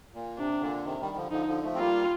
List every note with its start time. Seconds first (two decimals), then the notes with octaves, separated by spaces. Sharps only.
0.14 A#2
0.37 C3 D4
0.61 A#2 D3
0.84 C3 D#3
1.00 D#3 G3
1.16 D3 F3
1.31 D3 F3 D#4
1.48 D3 F3
1.63 F3 A3
1.75 C4
1.79 G3 A#3 F4